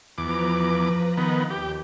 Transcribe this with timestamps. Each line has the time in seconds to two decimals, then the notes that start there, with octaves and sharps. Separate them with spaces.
0.18 E2 F3 B4 A#5 D6
1.17 D#3 B3
1.50 D#2 G4